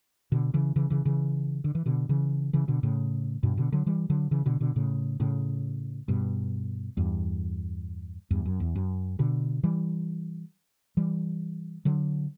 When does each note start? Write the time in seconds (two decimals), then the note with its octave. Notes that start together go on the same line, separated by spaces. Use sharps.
0.32 B2 D3
0.54 C#3 E3
0.76 C#3 E3
0.90 C#3 E3
1.05 C#3 E3
1.64 D3
1.75 E3
1.86 B2 D3
2.09 C#3 E3
2.53 C#3 E3
2.68 B2 D3
2.83 A2 C#3
3.43 G2 B2
3.57 B2 D3
3.72 D3 F#3
3.86 E3 G3
4.10 D3 F#3
4.31 C#3 E3
4.46 B2 D3
4.61 B2 D3
4.76 A2 C#3
5.20 A2 C#3
6.08 G2 B2
6.97 E2 G2
8.30 E2 G2
8.46 F#2
8.60 E2
8.75 F#2
9.19 B2 D3
9.64 E3 G3
10.97 E3 G3
11.85 D3 F#3